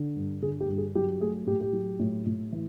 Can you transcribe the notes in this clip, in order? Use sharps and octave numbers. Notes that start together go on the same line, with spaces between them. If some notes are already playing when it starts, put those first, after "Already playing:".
Already playing: D3
G2
D3 G#4
G4
G2
G#4
F#3 G4
A3 G#4
A2 G4
G4
F#3
A2
A2
E3